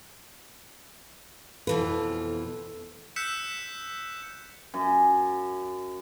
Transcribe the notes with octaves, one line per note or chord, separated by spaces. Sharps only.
F2 B2 E3 F4 A4 B4
E6 F#6 G6 B6 C#7 E7
F#2